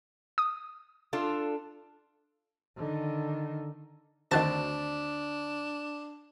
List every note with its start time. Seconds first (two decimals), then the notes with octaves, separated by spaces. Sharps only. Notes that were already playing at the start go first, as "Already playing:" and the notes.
0.38 D#6
1.13 D4 F4 A4
2.77 D3 D#3
4.31 D2 D#3 C4 D4 F#4 A5 A6